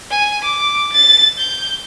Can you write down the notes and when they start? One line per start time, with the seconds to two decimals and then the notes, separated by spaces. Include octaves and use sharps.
0.11 G#5
0.44 D6
0.93 A6
1.39 G6